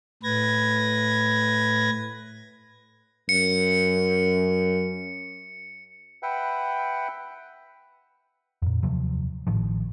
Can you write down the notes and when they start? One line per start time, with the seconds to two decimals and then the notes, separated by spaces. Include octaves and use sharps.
0.23 A2 B4 G#6 A#6
3.29 F#2 C#7
6.23 B4 E5 F#5 G5
8.62 F2 A#2
8.82 D#2 C3 F3 F#3
9.47 A1 A2 D#3 F3